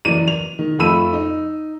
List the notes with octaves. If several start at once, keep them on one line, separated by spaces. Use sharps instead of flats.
F#1 E3 D5 D#7
F7
D#3
F2 A3 F4 B5 E6 D#7
D#4